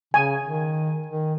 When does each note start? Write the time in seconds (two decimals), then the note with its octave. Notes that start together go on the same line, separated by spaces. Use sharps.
0.14 C#3 G#5
0.44 D#3
1.06 D#3